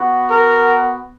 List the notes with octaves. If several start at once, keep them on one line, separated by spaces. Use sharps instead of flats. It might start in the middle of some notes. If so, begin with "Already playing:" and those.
Already playing: B3 F#4
A#4